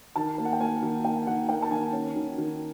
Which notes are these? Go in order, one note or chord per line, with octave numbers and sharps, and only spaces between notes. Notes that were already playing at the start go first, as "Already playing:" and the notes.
D#3 A5
A#3
F#5
G5
A#3 G#5
D#3
A#3 G5
D#3 F#5
A#3 G5
A5
D#3 G#5
C#4
D#3
D#3